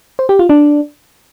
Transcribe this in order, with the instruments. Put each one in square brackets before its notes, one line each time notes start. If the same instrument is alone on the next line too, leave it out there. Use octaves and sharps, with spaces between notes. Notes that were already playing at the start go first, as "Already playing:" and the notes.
[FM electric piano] C5
G4
F4
D4